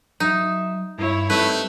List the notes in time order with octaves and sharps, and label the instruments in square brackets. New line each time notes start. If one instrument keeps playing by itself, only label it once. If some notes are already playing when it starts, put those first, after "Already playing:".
[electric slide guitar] F#3 E5 [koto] D#4
[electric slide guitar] G2 [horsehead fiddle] E4 C#5
[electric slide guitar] G3 C4 D#4 [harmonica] A3 [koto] B4